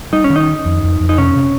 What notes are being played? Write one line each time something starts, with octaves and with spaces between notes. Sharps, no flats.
G3 D#4
C#4
D#3
D#4
C#4
F2
F2
F2
D#4
C3 C#4
C3